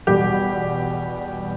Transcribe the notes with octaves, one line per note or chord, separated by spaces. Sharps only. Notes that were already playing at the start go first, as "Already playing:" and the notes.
E2 B2 G3 G4